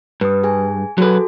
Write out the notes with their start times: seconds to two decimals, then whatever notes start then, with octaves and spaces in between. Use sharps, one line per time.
0.21 G2 B4 D#6
0.44 G#4 G#5
0.98 F#3 F#4 G#4 A4 B4